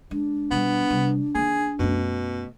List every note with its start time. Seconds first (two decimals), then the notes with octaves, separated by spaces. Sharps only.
0.11 G#3 D4
0.51 B2 G3 B3
0.90 C3 G3
1.35 D#3 A#3 G#4
1.79 F#2 B2 A3